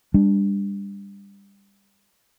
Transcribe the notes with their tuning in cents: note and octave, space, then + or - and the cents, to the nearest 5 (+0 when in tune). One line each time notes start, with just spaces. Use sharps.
G3 +30 D4 +0